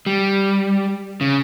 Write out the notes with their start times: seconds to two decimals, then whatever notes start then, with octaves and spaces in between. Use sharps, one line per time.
0.06 G3
1.21 C#3